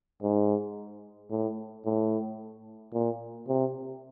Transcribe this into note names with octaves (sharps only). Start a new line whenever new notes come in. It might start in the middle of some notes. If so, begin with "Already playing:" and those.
G#2
A2
A2
A#2
C3